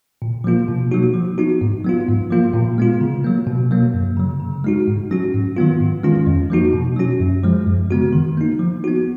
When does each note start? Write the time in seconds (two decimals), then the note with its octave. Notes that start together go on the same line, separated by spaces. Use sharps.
0.22 A#2
0.44 F3 A#3 F4
0.68 B2
0.91 F#3 A#3 D#4 F#4
1.14 F3
1.38 B3 D#4 F#4
1.61 G#2
1.84 F#3 B3 F4
2.08 G#2
2.30 F3 A#3 F4
2.54 A#2
2.78 G#3 B3 F4
3.01 C#3
3.25 F#3 A#3
3.47 B2
3.71 F#3 A#3
3.94 F#2
4.17 C#3 F#3
4.40 C#3
4.64 G#3 D#4 F#4
4.88 G#2
5.11 F#3 C#4 F#4
5.34 G#2
5.57 D#3 F#3 B3 F4
5.80 G#2
6.03 D#3 G#3 C#4 F4
6.26 F2
6.50 F3 A#3 D#4 F#4
6.73 B2
6.97 F#3 C#4 F#4
7.20 F#2
7.44 F3 G#3
7.67 F#2
7.90 C#3 G#3 B3 F#4
8.13 D#3
8.37 A#3 D#4
8.59 F3
8.84 B3 D#4 F#4